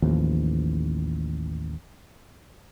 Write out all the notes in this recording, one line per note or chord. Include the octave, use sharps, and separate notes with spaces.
A1 D#2 F3